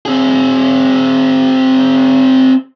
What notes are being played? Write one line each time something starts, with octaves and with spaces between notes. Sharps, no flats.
C4 G#4